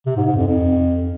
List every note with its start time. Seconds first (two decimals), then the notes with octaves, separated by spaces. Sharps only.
0.06 C3
0.16 G#2
0.26 G#2
0.37 F2
0.47 F2